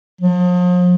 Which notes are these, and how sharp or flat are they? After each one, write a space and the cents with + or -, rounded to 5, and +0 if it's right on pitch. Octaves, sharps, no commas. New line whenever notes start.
F3 +40